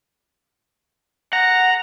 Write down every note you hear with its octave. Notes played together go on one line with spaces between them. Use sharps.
F#5 A#5